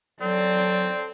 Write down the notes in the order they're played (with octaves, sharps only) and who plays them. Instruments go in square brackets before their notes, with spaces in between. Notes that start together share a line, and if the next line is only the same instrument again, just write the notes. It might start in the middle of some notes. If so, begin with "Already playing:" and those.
[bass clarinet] F#3 [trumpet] C4 [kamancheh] A4 [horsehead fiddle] D5